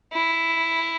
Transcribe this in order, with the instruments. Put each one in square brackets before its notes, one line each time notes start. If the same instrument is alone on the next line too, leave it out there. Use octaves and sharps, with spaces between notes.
[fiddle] E4